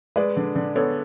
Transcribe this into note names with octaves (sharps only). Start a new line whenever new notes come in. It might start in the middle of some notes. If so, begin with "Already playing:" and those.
G#3 B4 D5
D3
D3
B3 A4 C#5